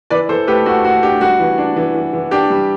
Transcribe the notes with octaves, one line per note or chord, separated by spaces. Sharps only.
E3 B4 D5
E3 A4 C5
A3 G4 B4
A3 F#4
A3 F#4
D4 G4
G3 F#4
E3
D4
E3
E3
E3
D4 G4
G3